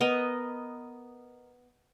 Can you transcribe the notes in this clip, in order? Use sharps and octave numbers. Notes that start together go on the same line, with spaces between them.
B3 A#4 D#5